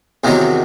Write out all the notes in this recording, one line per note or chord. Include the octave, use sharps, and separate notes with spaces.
E2 C3 D#3 F#3